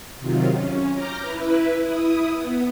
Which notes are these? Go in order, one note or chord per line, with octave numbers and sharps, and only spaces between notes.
C3 D#3 F#3 F4
C#4
A#5 D6 F6 G6 A#6
E4 B4
E4 D#6
B3